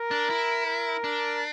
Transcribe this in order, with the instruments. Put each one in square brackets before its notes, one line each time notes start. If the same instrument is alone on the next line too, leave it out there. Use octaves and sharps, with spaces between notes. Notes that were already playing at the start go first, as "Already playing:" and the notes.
Already playing: [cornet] A#4
[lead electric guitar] D4
E4
[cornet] A#4
[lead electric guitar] D4